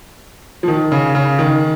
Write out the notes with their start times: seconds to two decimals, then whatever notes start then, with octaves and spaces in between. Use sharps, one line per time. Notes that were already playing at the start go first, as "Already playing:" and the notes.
0.63 F3
0.68 D#3
0.92 C#3
1.15 C#3
1.39 D#3